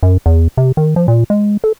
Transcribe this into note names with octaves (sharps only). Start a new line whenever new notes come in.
F#2
E2
C3
D#3
F3
A#2
G#3
A4